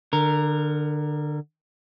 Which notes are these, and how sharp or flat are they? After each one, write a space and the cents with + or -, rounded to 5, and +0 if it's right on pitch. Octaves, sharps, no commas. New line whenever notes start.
D3 +25 A#4 +0